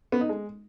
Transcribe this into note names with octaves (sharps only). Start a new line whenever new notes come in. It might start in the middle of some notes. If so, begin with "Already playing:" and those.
B3
D#4
G#3